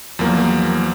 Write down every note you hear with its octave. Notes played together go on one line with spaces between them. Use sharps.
E2 F3 F#3 A#3